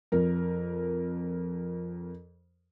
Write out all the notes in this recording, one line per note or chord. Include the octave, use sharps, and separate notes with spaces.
F2 A#4